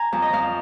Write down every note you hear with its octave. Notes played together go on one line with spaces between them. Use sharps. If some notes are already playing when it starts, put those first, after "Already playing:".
Already playing: G#5 A#5
F2
D#5
F2 F5